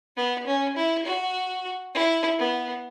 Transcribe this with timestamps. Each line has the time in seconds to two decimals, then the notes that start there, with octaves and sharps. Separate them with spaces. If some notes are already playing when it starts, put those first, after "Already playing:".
0.16 B3
0.47 C#4
0.76 E4
1.05 F#4
1.94 E4
2.39 B3